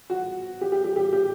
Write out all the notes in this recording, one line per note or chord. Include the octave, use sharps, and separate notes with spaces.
F#4
G4
G4
G4
G4
G4